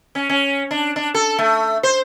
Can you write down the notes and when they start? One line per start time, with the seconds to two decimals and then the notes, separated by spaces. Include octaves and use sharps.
0.15 C#4
0.29 C#4
0.71 D4
0.96 D4
1.14 A4
1.38 A3
1.83 C5